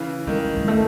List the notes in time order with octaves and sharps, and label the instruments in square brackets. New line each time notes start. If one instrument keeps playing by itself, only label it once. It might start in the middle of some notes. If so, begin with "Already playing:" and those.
Already playing: [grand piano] C#3 E3
[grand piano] D#3 [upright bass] G#3
[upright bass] G#3
A3